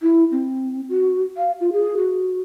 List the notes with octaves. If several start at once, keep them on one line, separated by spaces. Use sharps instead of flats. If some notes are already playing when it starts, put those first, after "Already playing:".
E4
C4
F#4
F5
F4
G#4
F#4